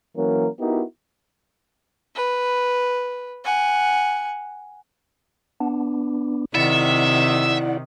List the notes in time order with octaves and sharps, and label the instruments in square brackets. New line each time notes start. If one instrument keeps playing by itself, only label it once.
[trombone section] E3 F#3 A#3 C#4 A#4
B3 D#4 E4 F#4 G4 A#4
[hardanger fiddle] B4
F#5 G#5
[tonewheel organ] B3 D4
[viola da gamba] C3 D#3 [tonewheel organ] E4 D5 F#5 [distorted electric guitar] E5